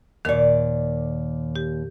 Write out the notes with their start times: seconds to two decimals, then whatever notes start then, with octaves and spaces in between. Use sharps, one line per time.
0.25 D#2 A#2 D#3 D5
1.56 G4